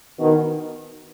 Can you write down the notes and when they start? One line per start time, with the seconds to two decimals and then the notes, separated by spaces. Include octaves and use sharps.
0.19 B2 D#3